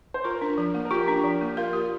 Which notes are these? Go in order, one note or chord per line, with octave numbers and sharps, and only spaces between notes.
C5
F4 A#4
D4
F3
A#3
A#4
F4 G4
D4
F3
A#3
F4 A#4
G4